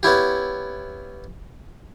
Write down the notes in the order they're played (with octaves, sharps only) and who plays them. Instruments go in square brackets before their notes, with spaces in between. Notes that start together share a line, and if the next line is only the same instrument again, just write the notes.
[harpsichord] B3 C#4 E4 G4